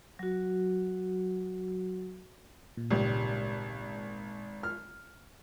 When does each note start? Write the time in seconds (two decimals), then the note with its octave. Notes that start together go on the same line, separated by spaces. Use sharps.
0.19 F#3 F#4
2.77 A#2
2.91 G#1 C#2 G3
4.63 F6